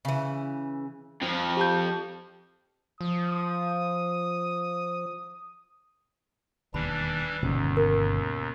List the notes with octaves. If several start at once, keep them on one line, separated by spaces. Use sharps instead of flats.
C#3 E3
F2 F3
G4 A5 G6
F3 D#6
E1 D#2 E3 G3 D4 B5
G1 D#2 B2 D#3 C#4
A#4